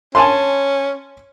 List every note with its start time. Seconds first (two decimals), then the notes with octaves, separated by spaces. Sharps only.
0.15 C#4 G#5 A5 C6